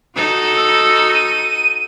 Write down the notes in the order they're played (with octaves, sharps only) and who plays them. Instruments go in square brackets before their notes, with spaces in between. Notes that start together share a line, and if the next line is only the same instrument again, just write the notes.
[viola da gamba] D#4 F#4 A4
[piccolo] E6
D#7